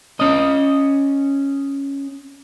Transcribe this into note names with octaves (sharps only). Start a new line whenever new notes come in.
C#4 D#5